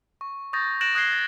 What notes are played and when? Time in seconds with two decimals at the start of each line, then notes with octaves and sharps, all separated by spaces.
0.21 C#6
0.53 C#6 D#6 G6 A6 A#6
0.81 F#6 A6 A#6 D7 E7 F#7
0.95 D#6 F#6 G#6 C7 G7
1.12 A6